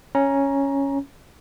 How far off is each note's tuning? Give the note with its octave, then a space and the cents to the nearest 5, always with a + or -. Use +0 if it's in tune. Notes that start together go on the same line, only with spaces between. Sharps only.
C#4 +0 A#5 +15